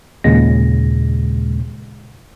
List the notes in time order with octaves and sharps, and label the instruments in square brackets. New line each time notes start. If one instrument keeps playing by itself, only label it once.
[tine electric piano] D#2 A#2 C#3 G#3 A#6